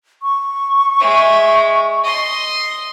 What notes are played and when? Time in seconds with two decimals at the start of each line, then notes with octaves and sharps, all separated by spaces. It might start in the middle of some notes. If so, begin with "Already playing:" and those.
0.23 C#6
1.00 G#3 E5
2.04 D#5 C6